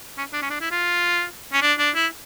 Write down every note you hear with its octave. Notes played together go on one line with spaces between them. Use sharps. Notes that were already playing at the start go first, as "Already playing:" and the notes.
C#4
D4
C#4
D4
E4
F4
C#4
D4
D4
E4